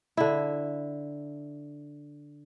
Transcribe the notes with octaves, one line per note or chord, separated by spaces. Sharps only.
D3 E4